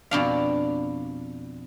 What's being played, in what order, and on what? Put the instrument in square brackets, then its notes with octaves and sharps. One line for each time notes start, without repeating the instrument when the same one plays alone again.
[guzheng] F2 B2 D4 F5